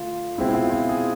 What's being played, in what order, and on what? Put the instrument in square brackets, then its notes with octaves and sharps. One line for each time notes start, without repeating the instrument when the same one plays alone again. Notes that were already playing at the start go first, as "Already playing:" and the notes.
Already playing: [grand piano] D3 A3 F4
B2 G#3 C4 E4
E4
F4
F4
G#4